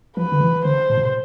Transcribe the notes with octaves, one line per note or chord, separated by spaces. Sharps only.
F3 B4
D3
E3
D3 C5
A2
B2